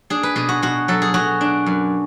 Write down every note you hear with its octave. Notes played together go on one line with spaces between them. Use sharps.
D4 G#4
B4
B2 G#4
F#4
B2 F#4
F#3 A4
G#4
F#3 F#4
D4
F#2